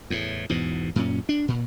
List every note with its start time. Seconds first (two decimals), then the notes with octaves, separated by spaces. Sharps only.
0.10 E2 A2
0.49 E2 G#2 B2
0.96 F#2 A#2 C#4
1.29 D4
1.48 A#2